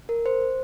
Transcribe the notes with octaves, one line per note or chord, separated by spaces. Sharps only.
A#4
C5